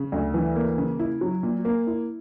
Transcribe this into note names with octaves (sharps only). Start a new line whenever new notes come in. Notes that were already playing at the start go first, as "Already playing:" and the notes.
Already playing: C#3
D2
E3
A#3
C#3
E4
F#3
A#2
A#3
E4